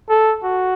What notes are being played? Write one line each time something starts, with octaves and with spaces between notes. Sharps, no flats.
A4
F#4